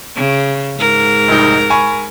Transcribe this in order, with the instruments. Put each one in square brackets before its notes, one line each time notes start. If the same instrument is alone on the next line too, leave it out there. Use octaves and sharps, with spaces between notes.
[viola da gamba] C#3
G#2 A#4
[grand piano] F1 C2 D#4
G#5 B5 C#6